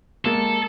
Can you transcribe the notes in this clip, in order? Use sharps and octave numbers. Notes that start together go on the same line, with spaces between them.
G#3 A#3 A4